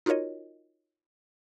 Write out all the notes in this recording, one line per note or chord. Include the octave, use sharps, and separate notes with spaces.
D#4 F4 F#4 A#4 C#5 D#5